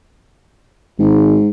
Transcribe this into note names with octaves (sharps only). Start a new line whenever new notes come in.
G#1 G#2